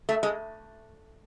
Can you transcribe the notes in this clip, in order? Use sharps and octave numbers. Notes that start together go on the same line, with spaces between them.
A3
G#3